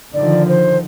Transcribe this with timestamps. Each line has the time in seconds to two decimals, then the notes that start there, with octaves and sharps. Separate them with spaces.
0.14 D3 D#3 F3 D5
0.49 C5